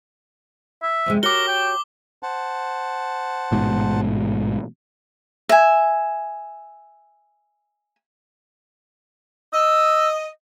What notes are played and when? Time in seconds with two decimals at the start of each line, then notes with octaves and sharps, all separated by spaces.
0.82 E5
1.06 F2 C3 G#3
1.23 F#4 G4 A#4 C#5 D6 G7
1.48 G5
2.23 C5 F#5 A5
3.52 A1 G#2 B2
5.49 E5 G#5
9.53 D#5 E6